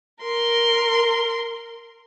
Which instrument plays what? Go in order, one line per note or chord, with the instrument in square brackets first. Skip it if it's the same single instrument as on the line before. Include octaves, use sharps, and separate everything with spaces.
[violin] A#4 C6